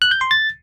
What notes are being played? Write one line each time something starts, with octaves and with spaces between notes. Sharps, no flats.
F#6
G6
C6
A6